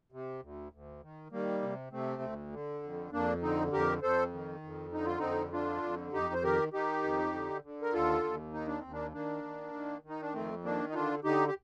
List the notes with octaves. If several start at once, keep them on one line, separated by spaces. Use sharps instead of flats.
C3
D2
D2
D#3
D#3 G3 A#3
C3
C3 A3 C4
D2
D3
F2
F2 A#3 D4
D3 C4 D#4
F2 G4 A#4
F2 A4 C5
D#3
F2
D3 D#4
F4
F2 C4 D#4
D3 D4 F4
F2
F2 D#4 G4
C5
D#3 G4 A#4
D#3 D#4 G4
F2
D3
D3
A#4
D#2 F4 A4
D#2
D#3 D#4
D4
D#2 C4
A#3 D4
D#3 A#3 D4
D#3
D#3
D#3
D#4
D4
F2 A3 C4
D#3 A#3 D4
D#4
D3 D4 F4
D3 D#4 G4
G4